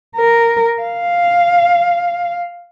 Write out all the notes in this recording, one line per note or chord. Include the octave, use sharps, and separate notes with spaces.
A#4
F5